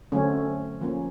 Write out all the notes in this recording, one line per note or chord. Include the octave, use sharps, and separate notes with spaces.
D3 F#3 A3 C4 C#4
F3 A#3 C#4